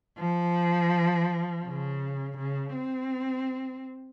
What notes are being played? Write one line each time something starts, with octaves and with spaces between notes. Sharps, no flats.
F3
C#3
C#3
C4